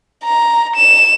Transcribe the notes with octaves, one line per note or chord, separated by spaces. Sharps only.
A#5
E7